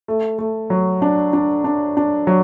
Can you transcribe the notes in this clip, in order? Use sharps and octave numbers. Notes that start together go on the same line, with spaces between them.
A3
A3
F#3
D4
D4
D4
D4
F#3